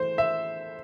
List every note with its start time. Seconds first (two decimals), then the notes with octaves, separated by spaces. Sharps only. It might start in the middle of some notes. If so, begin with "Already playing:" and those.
Already playing: E3 A3 C5
0.18 E5